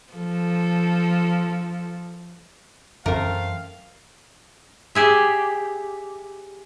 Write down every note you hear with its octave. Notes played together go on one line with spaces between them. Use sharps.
F3 A4
F#2 E3 A3 C4 C#4 A#4 F5
G4 G#4 E5